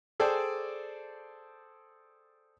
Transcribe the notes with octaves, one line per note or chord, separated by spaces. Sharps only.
G#4 A4 C5 D5 G5